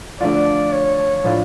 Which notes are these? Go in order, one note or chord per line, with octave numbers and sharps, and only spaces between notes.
D3 F3 A3 D4 F4 D5
C#5
A2 F3 A3 D4 F4